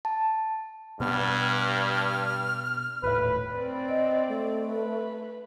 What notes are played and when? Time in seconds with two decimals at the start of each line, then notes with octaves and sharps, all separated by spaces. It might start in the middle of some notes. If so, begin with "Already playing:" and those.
0.05 A5
1.00 G2 B2 B3 F6
3.03 D#1 A2 B4
3.55 C4 D5
3.89 D#5
4.29 A3
4.68 B4